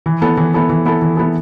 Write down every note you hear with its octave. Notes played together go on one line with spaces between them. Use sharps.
E3
B3 E4 A4
E3
B3 E4 A4
E3
B3 E4 A4
E3
B3 E4 A4